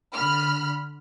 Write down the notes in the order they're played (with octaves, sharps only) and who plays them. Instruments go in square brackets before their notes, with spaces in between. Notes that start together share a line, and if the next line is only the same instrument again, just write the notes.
[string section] D3 B5 F6